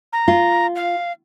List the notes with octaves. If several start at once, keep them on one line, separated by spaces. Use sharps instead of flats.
A#5
F4
F5